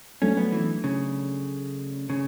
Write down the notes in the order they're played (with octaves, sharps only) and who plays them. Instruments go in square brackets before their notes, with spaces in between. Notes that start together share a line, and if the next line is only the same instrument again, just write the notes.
[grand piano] F#3 A3 D4 A4 [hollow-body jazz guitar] C#4
[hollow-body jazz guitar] B3
E3
C#3
C#3